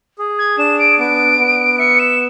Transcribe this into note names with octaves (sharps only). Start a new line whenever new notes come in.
G#4
G#6
D4 E7
D7
B3 D7
B3
E5 C#7
E7